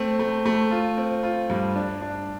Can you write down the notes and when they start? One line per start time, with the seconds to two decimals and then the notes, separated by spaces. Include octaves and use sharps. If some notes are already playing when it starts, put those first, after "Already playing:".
Already playing: A3 C4
0.19 A3
0.46 A3
0.71 F4
0.97 C4
1.23 F4
1.50 G2
1.76 D4
2.02 D4